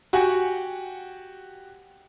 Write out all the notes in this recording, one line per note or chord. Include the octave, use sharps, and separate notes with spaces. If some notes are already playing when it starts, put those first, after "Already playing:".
F#4 G4 F#5 G#5